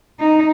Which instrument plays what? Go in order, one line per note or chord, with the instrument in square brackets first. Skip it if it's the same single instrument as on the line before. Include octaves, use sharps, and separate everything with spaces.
[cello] D#4